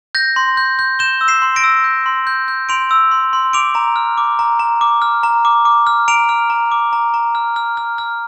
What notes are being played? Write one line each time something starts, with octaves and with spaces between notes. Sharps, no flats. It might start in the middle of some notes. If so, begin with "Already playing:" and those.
G6 A#6
C6
G6
G6
G6 E7 G7
E6
C7 E7
C6
A#6 D7
E6
G6
C6
G6
G6
C6 D7 F7
E6
C6
C6
D6 D7 F7
A#5
F6
D6
A#5
A#5
D6
F6
A#5
D6
D6
F6
A#5 D7 F7
F6
A#5
D6
A#5
A#5
F6
F6
F6
F6